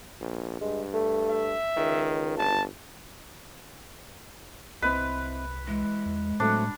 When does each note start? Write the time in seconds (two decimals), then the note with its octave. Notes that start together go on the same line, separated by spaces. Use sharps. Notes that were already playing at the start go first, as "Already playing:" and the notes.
0.21 A#1
0.61 G2 G#3
0.93 A3
1.30 E5
1.77 C#2 D#3
2.38 G1 A5
4.82 C2 C4 E4 B4 D#5
5.67 E3 G#3
6.06 E2
6.40 A2 F#3 A3 C4 D4